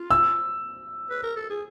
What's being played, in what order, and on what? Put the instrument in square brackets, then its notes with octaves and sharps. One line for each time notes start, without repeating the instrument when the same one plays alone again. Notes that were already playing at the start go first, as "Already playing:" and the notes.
Already playing: [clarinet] F4
[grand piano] E6
[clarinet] B4
A#4
A4
G#4